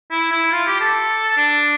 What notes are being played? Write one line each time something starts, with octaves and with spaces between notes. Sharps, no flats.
E4
E4
F4
G4
A4
D4